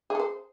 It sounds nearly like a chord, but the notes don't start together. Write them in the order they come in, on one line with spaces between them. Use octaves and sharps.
G#4 A4 C5